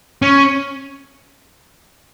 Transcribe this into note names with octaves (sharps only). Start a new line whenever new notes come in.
C#4